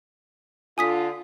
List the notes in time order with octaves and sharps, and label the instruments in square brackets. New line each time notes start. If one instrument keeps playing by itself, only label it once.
[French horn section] D3 F4 [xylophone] G#5 D#6 B6